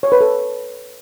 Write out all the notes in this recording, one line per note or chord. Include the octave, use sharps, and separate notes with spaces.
C#5
B4
A4